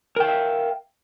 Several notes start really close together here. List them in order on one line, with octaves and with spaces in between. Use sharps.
A#4 G5 F5 E5